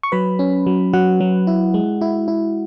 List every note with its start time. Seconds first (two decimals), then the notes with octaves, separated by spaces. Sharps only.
0.03 C#6
0.12 F#3 B4 B5
0.39 C#4
0.66 F#3
0.93 F#3 F#4 F#5
1.21 F#3
1.47 E4
1.74 G#3
2.01 E4
2.28 E4